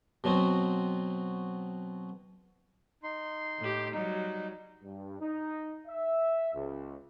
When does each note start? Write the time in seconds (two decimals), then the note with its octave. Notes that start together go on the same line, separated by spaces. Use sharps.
0.24 B2 F#3 B3 C4 F#4
3.03 D#4 C6
3.59 A2 G4
3.93 F#3 G3 D#4
4.83 G2
5.20 D#4
5.87 E5
6.53 C#2